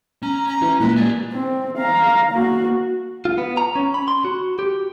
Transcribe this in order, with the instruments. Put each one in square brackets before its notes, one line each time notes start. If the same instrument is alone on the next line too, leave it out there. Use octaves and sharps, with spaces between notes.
[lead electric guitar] C#4 [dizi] A#5
[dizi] A#5
[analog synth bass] E3 [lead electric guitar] C#4
[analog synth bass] A#2 [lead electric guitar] G#3 [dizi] B4
[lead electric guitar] G4 G#5 [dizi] D5
[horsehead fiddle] C4
F5 A#5
A#3 F#4
[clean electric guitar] F4
B3
A#5
C#4
B5
C6
F#4
G4